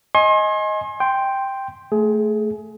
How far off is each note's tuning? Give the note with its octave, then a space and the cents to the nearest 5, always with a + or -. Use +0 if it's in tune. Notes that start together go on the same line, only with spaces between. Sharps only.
D#5 +10 G#5 +10 C6 +40
G5 +0 C6 +0
A3 +0 G#4 +25